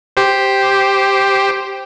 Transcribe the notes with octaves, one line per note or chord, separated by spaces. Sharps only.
G4 C5